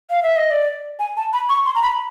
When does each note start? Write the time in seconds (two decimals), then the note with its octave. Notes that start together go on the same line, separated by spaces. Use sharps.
0.10 F5
0.22 E5
0.36 D#5
0.51 D5
0.99 G#5
1.17 A5
1.33 B5
1.49 C#6
1.66 C6
1.75 A#5
1.83 B5